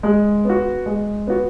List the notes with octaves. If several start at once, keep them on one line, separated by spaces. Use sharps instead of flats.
G#3
B3 F#4
G#3
B3 F#4